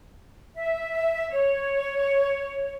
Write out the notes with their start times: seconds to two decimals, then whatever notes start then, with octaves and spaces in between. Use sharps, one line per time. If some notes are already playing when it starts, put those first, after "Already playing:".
0.56 E5
1.30 C#5